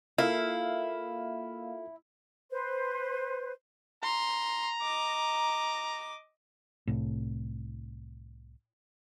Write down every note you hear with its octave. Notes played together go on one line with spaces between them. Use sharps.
A#3 E4 F4 A4 E5 F5
B4 C5
A#5 C6
D#5 D6
C2 A2